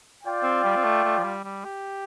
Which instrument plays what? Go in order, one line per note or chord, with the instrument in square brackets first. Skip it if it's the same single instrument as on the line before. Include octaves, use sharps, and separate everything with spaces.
[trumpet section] F4 D5 G5
[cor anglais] C4
G3
C4
A3
A3
F3
G3
G3
G4